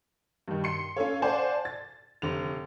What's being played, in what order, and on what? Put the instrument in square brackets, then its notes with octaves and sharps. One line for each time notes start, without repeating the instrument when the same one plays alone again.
[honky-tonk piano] G2 D#3
C6 C#7
C#4 F4 A4 C#5
C5 D5 F5 F#5 G#5 A5
A6
F1 D3 F7